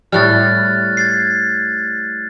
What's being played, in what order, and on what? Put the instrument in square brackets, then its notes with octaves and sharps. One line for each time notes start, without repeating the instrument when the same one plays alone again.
[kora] A2 G3 [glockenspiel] F6 F#6 A6
[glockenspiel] G#6 A6 C7